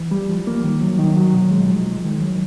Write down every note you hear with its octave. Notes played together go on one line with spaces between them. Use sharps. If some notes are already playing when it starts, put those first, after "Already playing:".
Already playing: E3
G3
F3
A#3
D#3
F#3
D#3
F#3
B2
G#3
F3
G#3
D#3
F#3